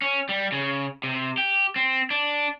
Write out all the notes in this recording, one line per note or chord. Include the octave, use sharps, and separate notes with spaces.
C#4
G3
C#3
C3
G4
C4
D4